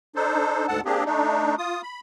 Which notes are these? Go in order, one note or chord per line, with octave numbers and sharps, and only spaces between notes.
D4 D#4 A4 C5
D2 G#2 A4 F#5 A5
A#3 C4 D4 G4 G#4
A3 D4 D#4
F4 D#6
B5